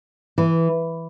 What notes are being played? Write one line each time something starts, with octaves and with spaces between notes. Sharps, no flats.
E3